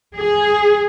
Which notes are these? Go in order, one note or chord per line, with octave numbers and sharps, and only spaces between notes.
G#4